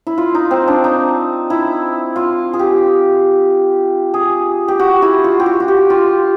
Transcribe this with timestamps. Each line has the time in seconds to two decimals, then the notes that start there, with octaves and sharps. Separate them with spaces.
0.07 E4
0.18 F4
0.35 D#4
0.51 C4
0.68 D4
0.84 D#4
1.50 E4
2.16 F4
2.53 G#4
2.59 G4
4.14 G#4
4.68 G4
4.80 F#4
5.02 E4
5.24 F4
5.40 G4
5.46 F#4
5.60 F#4
5.68 G4
5.90 F4